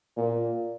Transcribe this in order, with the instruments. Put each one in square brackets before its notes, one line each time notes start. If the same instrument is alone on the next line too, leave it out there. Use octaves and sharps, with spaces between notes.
[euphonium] A#2